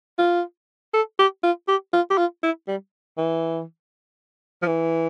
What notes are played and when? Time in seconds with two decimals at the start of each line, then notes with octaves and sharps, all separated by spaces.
0.19 F4
0.94 A4
1.19 G4
1.44 F4
1.68 G4
1.94 F4
2.10 G4
2.18 F4
2.43 E4
2.68 G3
3.18 E3
4.63 F3
4.67 E3